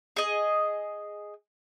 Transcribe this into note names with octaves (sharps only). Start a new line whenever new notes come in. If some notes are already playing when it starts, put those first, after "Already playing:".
G#4 D#5